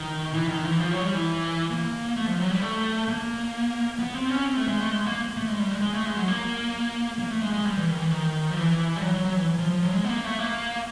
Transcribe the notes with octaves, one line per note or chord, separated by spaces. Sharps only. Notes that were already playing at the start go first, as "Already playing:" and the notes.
Already playing: D#3
E3
D#3
E3
F3
F#3
G3
E3
A#3
A3
F3
F#3
G3
A3
A#3
B3
C4
C#4
C4
A3
G#3
A3
G#3
A#3
A3
G#3
G3
G#3
G#3
A3
G#3
F#3
A#3
A#3
A3
G#3
G#3
G3
E3
D#3
E3
D#3
F3
E3
G3
F#3
F#3
F#3
E3
F3
F3
F#3
G#3
B3
A#3
A3
A#3